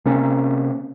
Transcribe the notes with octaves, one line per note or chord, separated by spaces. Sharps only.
C3 A#3 C#4